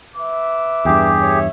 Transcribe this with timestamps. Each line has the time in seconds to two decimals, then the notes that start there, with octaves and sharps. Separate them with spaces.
0.16 B4 E5 D6
0.85 E2 G2 G4 G#4
1.20 C#5 E5